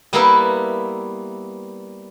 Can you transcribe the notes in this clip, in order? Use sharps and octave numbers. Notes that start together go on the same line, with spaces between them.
G3 A#3 B3 E4 B4 E5